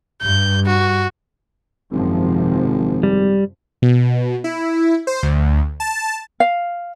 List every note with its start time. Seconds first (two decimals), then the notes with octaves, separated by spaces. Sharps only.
0.22 G2 G6
0.66 F#4
1.92 G#1 F#2 C3 F3
3.03 G3
3.82 B2
4.44 E4
5.07 C5
5.23 D2
5.80 A5
6.40 F5